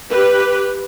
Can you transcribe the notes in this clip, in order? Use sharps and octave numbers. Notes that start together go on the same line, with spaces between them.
G4 B4